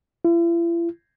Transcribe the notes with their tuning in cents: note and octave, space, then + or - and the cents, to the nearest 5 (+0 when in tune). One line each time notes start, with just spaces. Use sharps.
E4 +45